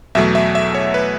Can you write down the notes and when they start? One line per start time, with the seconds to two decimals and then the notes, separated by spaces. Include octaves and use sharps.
0.15 E2 B2 F#3 A3 E5
0.35 E5
0.55 E5
0.75 C#5
0.94 B4